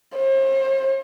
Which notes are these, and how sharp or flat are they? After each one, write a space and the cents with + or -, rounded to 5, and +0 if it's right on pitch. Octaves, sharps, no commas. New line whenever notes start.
C5 +40